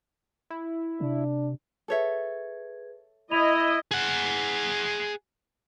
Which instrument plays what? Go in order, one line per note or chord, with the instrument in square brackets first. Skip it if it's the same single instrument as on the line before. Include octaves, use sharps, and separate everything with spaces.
[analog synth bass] E4
[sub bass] C3 [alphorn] D4
[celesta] G#4 B4 G#6 [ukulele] A4 C#5 E5
[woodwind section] E4 [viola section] D#5 [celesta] B5 D#7 F7
[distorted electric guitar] G#4 F#5